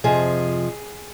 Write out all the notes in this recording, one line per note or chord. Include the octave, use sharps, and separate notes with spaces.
F2 C3 F3 G#4